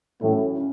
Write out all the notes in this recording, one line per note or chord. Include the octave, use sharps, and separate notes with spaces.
A2 C#3 F#3 C#4 E4
C#3